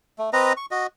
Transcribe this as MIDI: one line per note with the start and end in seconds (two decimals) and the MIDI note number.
0.19 0.30 57
0.33 0.53 60
0.33 0.53 71
0.33 0.53 75
0.33 0.53 82
0.57 0.66 85
0.71 0.87 66
0.71 0.87 75